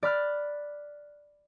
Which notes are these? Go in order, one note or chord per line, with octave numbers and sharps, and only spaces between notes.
D5 B5 F6 F#6